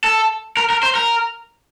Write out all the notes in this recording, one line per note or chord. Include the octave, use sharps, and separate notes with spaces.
A4
A#4
A#4
C5
A#4